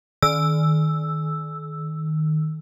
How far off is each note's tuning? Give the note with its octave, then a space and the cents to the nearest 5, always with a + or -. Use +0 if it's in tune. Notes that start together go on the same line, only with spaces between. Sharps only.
D#3 +0 E6 +0